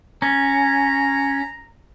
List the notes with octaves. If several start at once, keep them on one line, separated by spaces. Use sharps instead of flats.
C#4 A#5